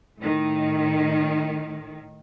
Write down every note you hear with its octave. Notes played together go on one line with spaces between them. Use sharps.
A2 D#3